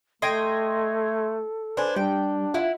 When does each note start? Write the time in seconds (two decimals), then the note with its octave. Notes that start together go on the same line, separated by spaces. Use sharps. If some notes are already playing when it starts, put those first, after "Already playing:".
0.22 A3 A4 D#5 G5 C6 G#6
1.77 D4 B4 C5 G#5
1.96 G3 D4 G5
2.54 E4 F4 F#5